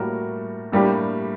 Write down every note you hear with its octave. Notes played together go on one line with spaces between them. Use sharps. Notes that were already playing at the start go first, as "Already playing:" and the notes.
Already playing: A2 G3 A#3 F#4 A#4
A2 G3 A#3 D4 G4